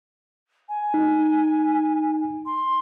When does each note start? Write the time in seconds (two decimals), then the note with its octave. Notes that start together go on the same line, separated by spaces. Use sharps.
0.69 G#5
0.94 D#4
2.46 C6